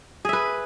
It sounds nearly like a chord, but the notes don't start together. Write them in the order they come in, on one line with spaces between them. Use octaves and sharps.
G#4 E5 B4